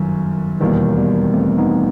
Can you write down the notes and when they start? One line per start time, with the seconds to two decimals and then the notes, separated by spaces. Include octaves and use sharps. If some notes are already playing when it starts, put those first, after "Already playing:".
Already playing: G1 F#2 D#3 F#3
0.60 E1 D#2 D#3 E3 G3
0.97 G3 B3
1.34 A3 C4
1.58 B3 D#4